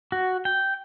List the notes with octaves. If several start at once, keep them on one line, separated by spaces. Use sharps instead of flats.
F#4
G5